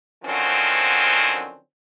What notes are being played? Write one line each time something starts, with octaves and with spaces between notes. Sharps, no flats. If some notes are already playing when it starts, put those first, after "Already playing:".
D3 D#3 F3 F#3 C4 C#4